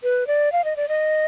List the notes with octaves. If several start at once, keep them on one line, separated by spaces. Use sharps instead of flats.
B4
D5
F5
D#5
D5
D#5